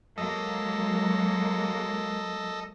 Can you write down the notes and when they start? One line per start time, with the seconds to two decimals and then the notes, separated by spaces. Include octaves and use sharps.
0.18 F#3 G#3 A#3 A4 D#5